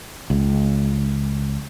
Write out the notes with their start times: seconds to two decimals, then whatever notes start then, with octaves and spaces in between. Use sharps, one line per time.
0.30 C#2